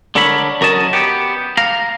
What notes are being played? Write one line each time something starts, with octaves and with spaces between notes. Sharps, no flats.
D3 D4 A4 A#4 C#5 B5
F#2 A#4 C#5 D#5 A5
B3 G4
F5 A#5